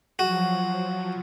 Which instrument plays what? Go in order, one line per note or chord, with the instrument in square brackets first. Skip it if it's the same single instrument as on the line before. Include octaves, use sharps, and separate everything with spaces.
[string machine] F3 F#3 [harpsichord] F#4